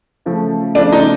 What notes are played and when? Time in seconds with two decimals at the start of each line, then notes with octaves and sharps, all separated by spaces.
0.26 C#3 F3 A3
0.75 C#3 F3 A3 D4
0.92 D#4